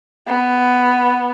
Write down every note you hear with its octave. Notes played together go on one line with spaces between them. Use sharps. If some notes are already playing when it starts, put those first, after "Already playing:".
B3